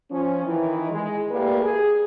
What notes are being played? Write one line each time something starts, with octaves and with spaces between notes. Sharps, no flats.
F3 C#4
D#3 E3
G#3
A2 A#3 G4 B4 D5
G#4